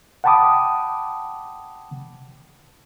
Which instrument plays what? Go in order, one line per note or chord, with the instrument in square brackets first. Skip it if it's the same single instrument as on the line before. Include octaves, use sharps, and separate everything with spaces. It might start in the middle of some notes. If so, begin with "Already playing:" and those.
[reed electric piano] F#5 G5 A5 B5 D6 D#6